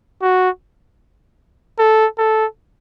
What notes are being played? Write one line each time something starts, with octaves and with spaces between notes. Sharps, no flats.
F#4
A4
A4